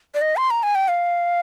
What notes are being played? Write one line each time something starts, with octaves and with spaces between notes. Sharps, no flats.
D5
D#5
C6
A#5
G#5
G5
F5